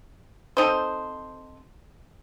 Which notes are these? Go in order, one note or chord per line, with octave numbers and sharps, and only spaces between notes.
C4 D#4 A4 C5